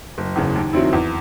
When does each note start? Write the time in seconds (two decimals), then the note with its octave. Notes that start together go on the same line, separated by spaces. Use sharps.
0.18 F#1
0.36 E2 C#3
0.55 D#2
0.73 D#3 F#3 C4 E4
0.93 E2